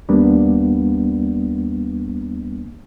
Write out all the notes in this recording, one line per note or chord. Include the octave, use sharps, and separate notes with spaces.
D#2 G3 A#3 B3 D4